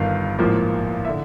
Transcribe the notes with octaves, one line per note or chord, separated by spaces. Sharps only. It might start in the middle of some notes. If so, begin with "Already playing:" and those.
Already playing: G1 G2 D#3 F5
A1 G#2 F3 A#3
D3 E5